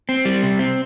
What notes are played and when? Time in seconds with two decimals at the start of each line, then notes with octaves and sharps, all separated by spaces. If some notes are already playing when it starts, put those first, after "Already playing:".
0.09 C4
0.25 G3
0.43 C3
0.59 C4